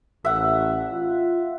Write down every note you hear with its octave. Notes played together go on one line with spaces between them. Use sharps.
A1 E5 F#5
F4